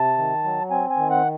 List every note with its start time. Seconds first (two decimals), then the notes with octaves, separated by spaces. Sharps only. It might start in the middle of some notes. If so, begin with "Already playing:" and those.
Already playing: C3 A5
0.18 D#3
0.44 F#3
0.70 C4 G#5
0.90 G#5
0.97 D#3
1.10 F#5